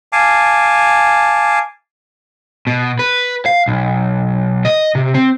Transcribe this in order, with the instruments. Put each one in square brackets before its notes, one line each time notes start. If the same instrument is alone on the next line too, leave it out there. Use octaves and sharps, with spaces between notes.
[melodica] F5 G#5 A5 D6
[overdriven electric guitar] B2
B4
F5
B1
D#5
C3
C4